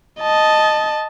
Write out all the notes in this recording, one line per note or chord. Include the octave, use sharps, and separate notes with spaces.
D#5 A5